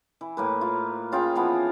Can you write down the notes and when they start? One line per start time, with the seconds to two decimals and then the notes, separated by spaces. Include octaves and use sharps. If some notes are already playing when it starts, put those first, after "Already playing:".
0.21 E3
0.37 A2 A#3 B4
0.61 F4
1.12 C#4 F4 G#4 G5
1.35 E3 F3 B3 F4